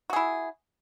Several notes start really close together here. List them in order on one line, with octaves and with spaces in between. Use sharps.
F#4 G#4 E4